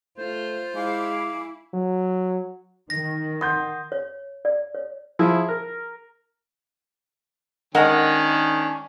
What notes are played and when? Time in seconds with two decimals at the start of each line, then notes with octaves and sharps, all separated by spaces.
0.18 A3 F4 C5
0.75 G#3 E4 F5 G#5 D6
1.74 F#3
2.90 D#3 A#6
3.41 F#5 C6 D#6 G6
3.92 C#5
4.45 D5
4.75 C#5
5.19 F3 E4 G#4
5.49 A#4
7.75 D#3 G#3 C#4 D4 A#4 F#5